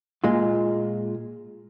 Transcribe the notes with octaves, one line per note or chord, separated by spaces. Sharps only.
A#2 G#3 F4